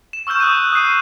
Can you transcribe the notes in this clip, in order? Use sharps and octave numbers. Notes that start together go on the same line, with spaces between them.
E7
C#6 E6 F6 G6 E7
D#6 F#6 G6 D#7
D#6 F#6 C7 D#7